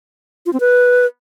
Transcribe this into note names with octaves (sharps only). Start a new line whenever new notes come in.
F4
C4
B4